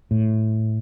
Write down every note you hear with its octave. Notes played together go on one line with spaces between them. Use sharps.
A2